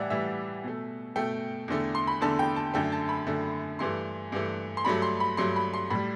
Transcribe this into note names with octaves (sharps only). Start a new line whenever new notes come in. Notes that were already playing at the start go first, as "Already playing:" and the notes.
Already playing: A2 E3 G3 D5 E5 F#5
A2 E3 G3 E5
B2 A3
B2 A3 G5
E2 D3 A3
C6
B5
E2 D3 A3 A5
G5
A5
F#2 D3 A3 G5
A5
B5
F#2 D3 A3
G2 E3 A3 C6
G2 E3 A3
C6
G2 F#3 A3 B5
C6
B5
G2 F#3 A3 C6
B5
C6
A2 G3 B5